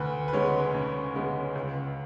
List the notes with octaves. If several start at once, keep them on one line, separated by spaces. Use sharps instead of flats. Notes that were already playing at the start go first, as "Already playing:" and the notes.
Already playing: D2 B4
B4
C#3 G#3 B3 C#5
D2
C#3 G#3 B3
C#2